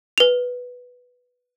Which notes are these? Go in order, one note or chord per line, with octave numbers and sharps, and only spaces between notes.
B4 F7